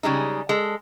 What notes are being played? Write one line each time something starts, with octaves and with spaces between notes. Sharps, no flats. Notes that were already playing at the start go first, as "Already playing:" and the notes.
C#3 G3 G#3 D#4
G#3 A4